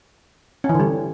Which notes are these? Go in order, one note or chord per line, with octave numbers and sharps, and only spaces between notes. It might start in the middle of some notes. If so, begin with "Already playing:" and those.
C#4
E3
D3
G3